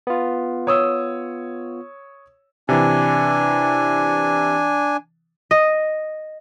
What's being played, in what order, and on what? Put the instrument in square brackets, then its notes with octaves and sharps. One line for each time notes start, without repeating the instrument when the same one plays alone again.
[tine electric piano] B3 F4
[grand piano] C#5 D#6 E6
[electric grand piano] C3 E3 [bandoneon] D4 G#5
[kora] D#5